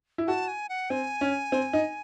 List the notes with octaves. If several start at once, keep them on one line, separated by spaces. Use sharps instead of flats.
E4
F#4 A5
G#5
F#5
C4 G#5
C#4
C4
D#4